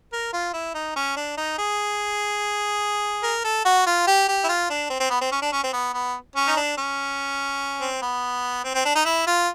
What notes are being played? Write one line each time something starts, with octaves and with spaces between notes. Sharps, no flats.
A#4
F4
E4
D#4
C#4
D4
D#4
G#4
A#4
A4
F#4
F4
G4
G4
E4
F4
D4
C4
C4
B3
C4
C#4
D4
C#4
C4
B3
B3
C#4
D#4
D4
C#4
C4
B3
C4
C4
D4
D#4
E4
F4